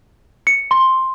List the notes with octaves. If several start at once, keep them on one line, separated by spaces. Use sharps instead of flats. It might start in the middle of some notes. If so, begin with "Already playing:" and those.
C#7
C6